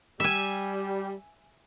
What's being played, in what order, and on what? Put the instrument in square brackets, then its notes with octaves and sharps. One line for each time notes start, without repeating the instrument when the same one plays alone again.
[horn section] G3 [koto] E5 G#5